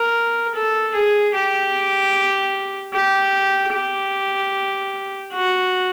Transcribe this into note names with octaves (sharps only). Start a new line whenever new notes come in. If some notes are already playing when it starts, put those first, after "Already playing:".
Already playing: A#4
A4
G#4
G4
G4
G4
F#4